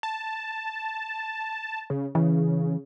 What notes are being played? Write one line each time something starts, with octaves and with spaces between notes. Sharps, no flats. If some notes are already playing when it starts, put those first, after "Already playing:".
A5
C#3
C#3 E3